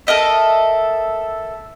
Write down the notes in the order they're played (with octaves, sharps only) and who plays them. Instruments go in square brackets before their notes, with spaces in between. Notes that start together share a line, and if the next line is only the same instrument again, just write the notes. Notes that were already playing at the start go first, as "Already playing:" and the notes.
[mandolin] A4 A#4 D#5 E5